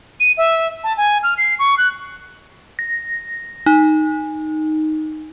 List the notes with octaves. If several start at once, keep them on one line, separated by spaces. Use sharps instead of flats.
D#7
E5
A5
G#5
F6
C7
C#6
F#6
A#6
D#4